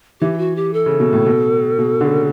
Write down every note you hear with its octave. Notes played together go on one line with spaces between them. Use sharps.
E3 G4
F#4
G4
A4
C#3
B2
A2
B2
B2
D3
C#3